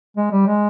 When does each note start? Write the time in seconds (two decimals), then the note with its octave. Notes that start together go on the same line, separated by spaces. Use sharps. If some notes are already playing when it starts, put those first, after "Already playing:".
0.17 G#3
0.32 G3
0.47 G#3